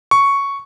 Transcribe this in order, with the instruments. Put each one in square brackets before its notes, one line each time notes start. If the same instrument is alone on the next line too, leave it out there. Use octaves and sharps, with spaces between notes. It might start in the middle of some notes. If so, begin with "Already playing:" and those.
[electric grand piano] C#6